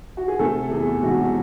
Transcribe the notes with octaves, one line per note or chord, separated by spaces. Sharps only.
F#4
G#4
C3 A3 A4
E2 G#4
E1 F#4